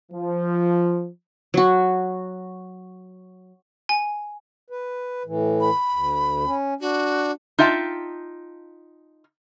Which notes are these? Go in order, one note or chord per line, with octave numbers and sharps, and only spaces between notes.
F3
F#3 F#4
G#5
B4
A2 E3
B5
D2
C#4
D4 F#4
D#4 F4 E5 G5 A5